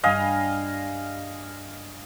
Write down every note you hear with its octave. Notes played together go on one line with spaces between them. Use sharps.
G2 G3 D#5 F5 G#5 B5